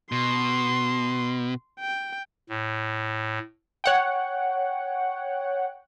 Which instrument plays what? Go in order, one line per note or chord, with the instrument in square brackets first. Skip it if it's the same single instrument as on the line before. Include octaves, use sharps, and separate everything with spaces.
[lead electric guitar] B2 [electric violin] C6
[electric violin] G5
[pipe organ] A2
[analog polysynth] C#5 F#5 G5